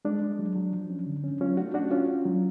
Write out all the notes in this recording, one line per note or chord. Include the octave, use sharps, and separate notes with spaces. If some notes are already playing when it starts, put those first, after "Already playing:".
G#3 D4
G#3
F#3
F#3
F3
C#4
D3
C#4
F#3 C#4 F4
A3 D4 F#4
C#4 D4 F#4
C#4 F4
C#4
F#3